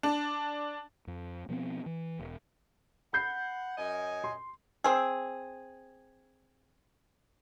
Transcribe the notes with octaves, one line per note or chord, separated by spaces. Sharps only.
D4
F2
B2 F3 B3 C4
E3
E1
F#5 B5 G6 C7
F#2 D#5 G#5
C6
C4 G#4